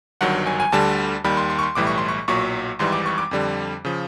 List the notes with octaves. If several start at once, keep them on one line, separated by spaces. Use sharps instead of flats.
G1 G2 D#3 F#3 F#5
G#5
G#5
D2 D3 G3 A5
D#2 D#3 G3 B5
C6
C6
C#6
C6
B1 A2 E3 G3 D6
C#6
C6
C#6
B1 A#2 F#3 C#6
G#1 G#2 E3 G3 C6
D6
C#6
D6
F2 D3 G3
C#3 F3